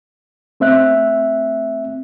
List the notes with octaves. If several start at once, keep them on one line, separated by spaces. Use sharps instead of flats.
A3 C4 E5 F#6